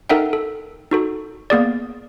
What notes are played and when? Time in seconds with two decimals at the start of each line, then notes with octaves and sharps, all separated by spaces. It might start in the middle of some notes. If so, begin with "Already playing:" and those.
0.09 D#4 A4 A#4 E5 F#5 G5
0.33 A4
0.91 D#4 F#4 A4
1.50 A#3 B3 G#4 D5